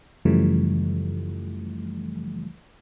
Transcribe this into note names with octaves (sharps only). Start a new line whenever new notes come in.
F#2 C#3 E3 F3 G3 A3